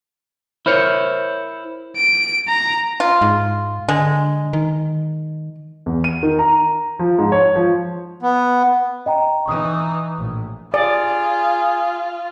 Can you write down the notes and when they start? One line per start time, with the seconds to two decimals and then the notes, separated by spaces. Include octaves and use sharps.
0.66 E4 A#4 C5 C#5
1.97 D7
2.48 A#5
3.00 F4
3.21 G#2
3.89 D3 G#3
4.53 D#3
5.86 E2
6.04 D#7
6.23 D#3
6.39 A#5
6.99 F3
7.19 G#2
7.32 C#5
7.56 F3
8.23 B3
9.06 D#5 G5 A#5
9.46 E3 D#4 C#6 D#6
10.16 A#1 A2
10.74 F4 G#4 D5